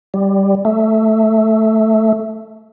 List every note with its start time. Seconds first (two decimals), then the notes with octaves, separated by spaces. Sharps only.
0.14 G3
0.65 A3